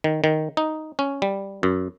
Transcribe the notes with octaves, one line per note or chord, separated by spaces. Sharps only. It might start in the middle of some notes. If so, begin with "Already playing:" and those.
D#3
D#3
D#4
C#4
G3
F#2